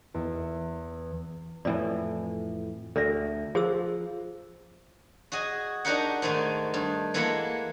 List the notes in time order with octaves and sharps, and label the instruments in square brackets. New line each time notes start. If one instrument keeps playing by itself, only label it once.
[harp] E2
[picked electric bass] F2 A2 E3 [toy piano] D5
[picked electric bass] D2 [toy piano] A4 D5 E5
[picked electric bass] F3 [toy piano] G#4 C5 E6
[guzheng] F#4 G#4 D#5
D4 D#4 F#4 G4 A#4 F#5
G#2 D#3 G#3 A3 D#4
G2
E3 G#3 A#3 A4 F#5 B5